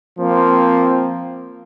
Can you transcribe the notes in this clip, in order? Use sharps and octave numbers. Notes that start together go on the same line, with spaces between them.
F3 A#3 C4